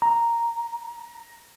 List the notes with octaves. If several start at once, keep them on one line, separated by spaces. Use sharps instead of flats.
A#5